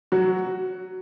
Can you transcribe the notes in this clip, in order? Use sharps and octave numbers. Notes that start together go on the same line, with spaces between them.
F#3 F#4